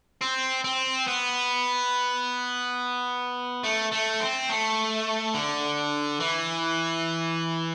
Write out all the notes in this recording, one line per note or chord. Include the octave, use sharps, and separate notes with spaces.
C4
C4
B3
A3
A3
C4
A3
D3
E3